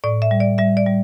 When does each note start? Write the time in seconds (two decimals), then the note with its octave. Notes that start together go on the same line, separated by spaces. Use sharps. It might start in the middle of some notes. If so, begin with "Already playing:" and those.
0.04 A2 D5
0.22 E5
0.31 G3
0.40 D5
0.58 G3 E5
0.77 D5
0.86 G3